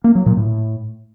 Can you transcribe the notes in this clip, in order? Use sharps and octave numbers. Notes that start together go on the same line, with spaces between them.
A#3
F#3
A#2
A2